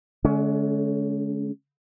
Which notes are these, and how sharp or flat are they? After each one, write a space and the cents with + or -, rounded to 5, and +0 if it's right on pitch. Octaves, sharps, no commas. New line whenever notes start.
D3 -15 G#3 +35 C#4 +20